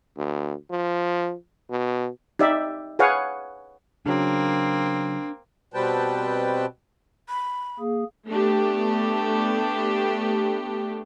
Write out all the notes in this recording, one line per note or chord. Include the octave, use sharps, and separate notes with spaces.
D2
F3
B2
D#4 G4 D5 E5
G#4 B4 C#5 F5 F#5 G#5
C#3 F#3 A#3 C4 D4
B2 G3 C4 B4 G5 A5
B5
A#3 G#4
A3 B3 D4 G4